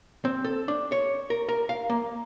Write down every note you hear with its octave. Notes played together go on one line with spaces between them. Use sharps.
C4
A4
D4
C#5
A#4
A#4
F5
A#3